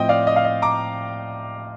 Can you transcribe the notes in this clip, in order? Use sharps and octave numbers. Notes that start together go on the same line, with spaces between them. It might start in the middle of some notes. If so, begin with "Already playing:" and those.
Already playing: A2 F3 C4 D#5 G5
D5 F5
D#5
F5
D#5
A#5 D6